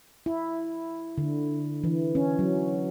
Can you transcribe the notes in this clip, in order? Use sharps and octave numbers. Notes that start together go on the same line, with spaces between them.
E4
D3
E3
C#4
F#3